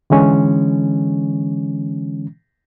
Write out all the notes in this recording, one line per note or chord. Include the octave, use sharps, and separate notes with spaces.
D3 E3 G#3 C#4